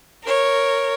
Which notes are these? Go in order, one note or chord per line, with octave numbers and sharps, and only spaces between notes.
A#4 C#5